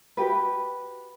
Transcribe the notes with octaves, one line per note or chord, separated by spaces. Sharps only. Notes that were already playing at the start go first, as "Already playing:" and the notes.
F#4 G4 B4